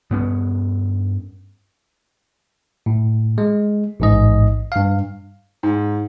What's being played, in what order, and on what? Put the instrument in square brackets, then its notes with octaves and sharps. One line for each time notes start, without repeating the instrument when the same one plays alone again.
[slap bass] G2 B3 C#4
[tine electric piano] A2
G#3
A1 G#2 D#5
G2 F5
[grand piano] G#2